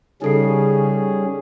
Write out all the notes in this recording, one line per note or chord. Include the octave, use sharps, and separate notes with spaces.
C#3 G3 C#4 D#4 G#4 A4 C7